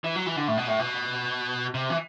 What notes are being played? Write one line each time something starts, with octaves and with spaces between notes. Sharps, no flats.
E3
F#3
E3
D3
A2
B2
A2
B2
C3
E3